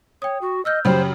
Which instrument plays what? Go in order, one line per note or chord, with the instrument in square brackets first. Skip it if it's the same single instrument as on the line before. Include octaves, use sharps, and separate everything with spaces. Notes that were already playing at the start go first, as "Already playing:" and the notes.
[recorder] C#5 [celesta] G5 D#6
[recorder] F#4
[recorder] D#5 [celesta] E6 F6 G6
[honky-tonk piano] F#2 C#3 [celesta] G4 G5 B5 [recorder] C5